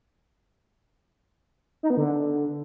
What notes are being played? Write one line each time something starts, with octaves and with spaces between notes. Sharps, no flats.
D#4
B3
D3